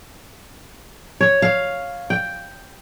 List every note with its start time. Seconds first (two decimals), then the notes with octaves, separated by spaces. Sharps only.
1.21 C#5
1.42 F5
2.10 G5